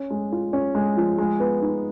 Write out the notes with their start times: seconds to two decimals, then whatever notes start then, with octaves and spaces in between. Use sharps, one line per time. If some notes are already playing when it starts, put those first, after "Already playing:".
Already playing: C#4
0.10 G#3
0.32 F4
0.53 C#4
0.75 G#3
0.97 F3
1.18 G#3
1.40 B3
1.62 D#4